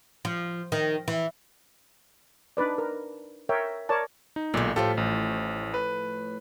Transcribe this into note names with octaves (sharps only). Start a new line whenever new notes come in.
F3
D#3
E3
D4 D#4 B4 D5
A#4
A#4 C#5 E5 G5
A#4 C#5 D5 A5
D#4
B1 A#2 D3 G#3
A2 F3 A3 F4 G4 A4
A1
B4